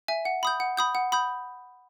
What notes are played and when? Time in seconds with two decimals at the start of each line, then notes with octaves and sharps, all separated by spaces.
0.08 E5 G#5
0.25 F#5
0.43 B5 D#6 G6
0.60 F#5
0.77 B5 D#6 G6
0.95 F#5
1.12 B5 D#6 G6